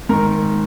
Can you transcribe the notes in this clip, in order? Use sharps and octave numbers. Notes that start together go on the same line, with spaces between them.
G#2 D#3 A#4